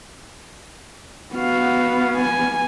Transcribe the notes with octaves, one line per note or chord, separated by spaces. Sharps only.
B3 F#4 F5
G#5